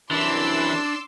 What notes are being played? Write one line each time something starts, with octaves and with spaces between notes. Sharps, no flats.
C2 F#2 E3 D4 E4 C6 D6 E6